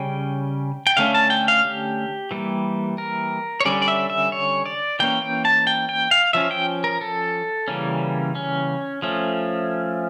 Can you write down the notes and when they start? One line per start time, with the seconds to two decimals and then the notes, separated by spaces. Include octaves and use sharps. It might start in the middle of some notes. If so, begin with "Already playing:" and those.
Already playing: C#3 G3 C#4 G5
0.87 G5
0.97 D3 A3 C#4 F5
1.14 A5
1.30 G5
1.48 F5
1.65 G4
2.31 E3 G3 A#3
2.98 A#4
3.60 C#5
3.65 D3 G3 C#4 D5
3.82 D5
3.88 E5
4.10 E5
4.32 C#5
4.66 D5
4.99 E3 A#3 C#4 G5
5.22 G5
5.45 A5
5.67 G5
5.89 G5
6.11 F5
6.33 F3 C#4 E5
6.51 G5
6.84 A#4
7.01 A4
7.68 C#3 E3 G3 A#3 C#4
8.35 C#4
9.02 F3 A3 C#4